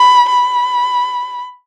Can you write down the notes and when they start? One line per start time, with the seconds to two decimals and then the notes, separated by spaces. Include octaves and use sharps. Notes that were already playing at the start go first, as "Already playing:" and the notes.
Already playing: B5
0.29 B5